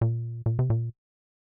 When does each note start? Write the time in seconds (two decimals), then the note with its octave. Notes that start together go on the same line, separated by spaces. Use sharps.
0.01 A#2
0.46 A#2
0.59 C3
0.70 A#2